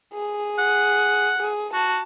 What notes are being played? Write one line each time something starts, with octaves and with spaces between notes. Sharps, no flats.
G#4
F#5
G#4
F#4 A5